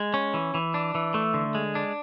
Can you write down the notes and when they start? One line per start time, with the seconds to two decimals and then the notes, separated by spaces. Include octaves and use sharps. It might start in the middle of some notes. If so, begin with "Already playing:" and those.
Already playing: G#3
0.14 C#4
0.34 E3
0.54 E3
0.74 D4
0.95 E3
1.14 A3
1.34 D3
1.55 G#3
1.75 D4